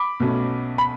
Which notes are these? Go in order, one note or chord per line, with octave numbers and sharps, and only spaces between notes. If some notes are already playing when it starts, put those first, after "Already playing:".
Already playing: B5 D6
B1 B2 A3 C#4
B5